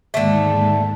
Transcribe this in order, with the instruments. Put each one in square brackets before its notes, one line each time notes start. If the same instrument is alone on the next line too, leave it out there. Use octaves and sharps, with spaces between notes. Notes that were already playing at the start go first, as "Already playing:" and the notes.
[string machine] D#2 G#2 [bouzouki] D3 A3